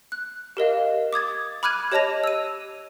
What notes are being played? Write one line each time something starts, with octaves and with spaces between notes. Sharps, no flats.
F#6
G4 A#4 D#5 F5
D6 D#6 G#6 A6
B5 D6 F6 F#6 G#6 D#7
G4 C#5 D#5 A5 A#6 F7
E6 D#7